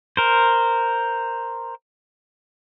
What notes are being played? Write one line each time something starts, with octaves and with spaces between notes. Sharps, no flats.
A#4 C5